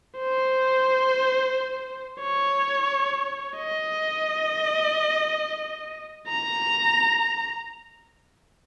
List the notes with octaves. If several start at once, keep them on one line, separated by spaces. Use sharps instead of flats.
C5
C#5
D#5
A#5